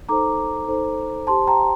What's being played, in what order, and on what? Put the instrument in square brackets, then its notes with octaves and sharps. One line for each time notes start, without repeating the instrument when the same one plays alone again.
[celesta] D#4 A4 C5 A#5 D6
D#4 A4 C5
G4 C5 A5 C6
G5 A#5